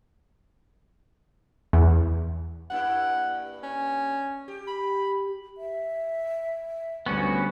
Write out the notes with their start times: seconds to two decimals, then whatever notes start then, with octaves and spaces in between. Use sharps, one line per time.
1.73 E2
2.70 G2 A#3 E4 F#5
3.63 C#4
4.48 G4
4.67 B5
5.58 E5
7.06 D2 G3 B3 C#4 F#4 C#6